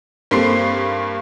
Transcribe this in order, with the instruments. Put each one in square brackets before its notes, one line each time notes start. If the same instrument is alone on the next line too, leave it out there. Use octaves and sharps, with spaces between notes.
[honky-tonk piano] G2 A#3 C4 A4 C6 C7